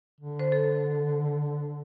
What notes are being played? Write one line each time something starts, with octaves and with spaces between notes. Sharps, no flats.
D3
C5
A4